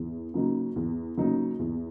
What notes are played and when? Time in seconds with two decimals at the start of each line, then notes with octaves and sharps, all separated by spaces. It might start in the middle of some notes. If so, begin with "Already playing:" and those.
Already playing: E2
0.34 C#3 F#3 A#3 D#4
0.76 E2
1.17 C#3 F#3 A#3 D#4
1.59 E2